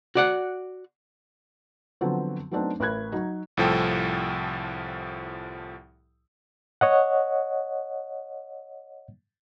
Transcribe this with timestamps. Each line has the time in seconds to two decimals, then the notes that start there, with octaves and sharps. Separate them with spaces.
0.15 F#4 D5 F#5
2.01 D3 F3 F#3 B3 C4
2.51 F#3 A3 B3 C4 D4 D#4
2.80 A1 A#4 B5 F#6 G#6
3.12 F#3 D#4
3.57 C2 A2 F3 A4 G5
6.81 C#5 D#5 F#5